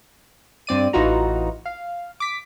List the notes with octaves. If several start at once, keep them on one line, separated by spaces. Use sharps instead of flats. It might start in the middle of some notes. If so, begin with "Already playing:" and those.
G2 C4 D5 D#7
A1 E3 D#4 F4 F#4 A#5
F5
D6 B6